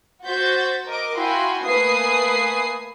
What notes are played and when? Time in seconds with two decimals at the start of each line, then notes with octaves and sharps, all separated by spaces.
0.24 F#4 C5 G6 A6 B6
0.85 A#4 D#5 D6
1.16 E4 F#4 F5 G5 G#5 C6
1.64 A3 A#3 B4 G#5 D#6 C7